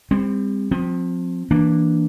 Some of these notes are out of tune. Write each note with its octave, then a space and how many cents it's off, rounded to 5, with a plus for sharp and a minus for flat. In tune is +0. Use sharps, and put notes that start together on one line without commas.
G3 +40 C4 +0
F3 +30 C4 +0
E3 -10 A#3 +0 D4 +0